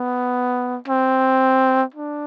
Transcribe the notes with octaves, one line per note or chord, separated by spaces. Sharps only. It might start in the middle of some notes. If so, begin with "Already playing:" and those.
Already playing: B3
C4
D4